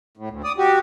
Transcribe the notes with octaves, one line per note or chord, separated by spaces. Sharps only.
A2
D2
D5 D#6
F#4 G4